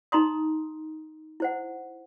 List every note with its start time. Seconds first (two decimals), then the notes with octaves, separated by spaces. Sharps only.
0.12 D#4 A#5 C6 D#6
1.40 E4 C5 F#5